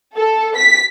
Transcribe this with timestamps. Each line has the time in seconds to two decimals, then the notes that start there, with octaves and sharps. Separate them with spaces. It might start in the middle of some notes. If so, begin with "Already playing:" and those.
0.17 A4
0.57 B6